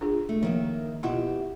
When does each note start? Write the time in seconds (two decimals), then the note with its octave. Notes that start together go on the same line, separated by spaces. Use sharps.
0.01 D4 F4 G#4
0.29 A3
0.43 D#3 F3 A#3 E5
1.03 B2 E4 F4 G4 E5 F#5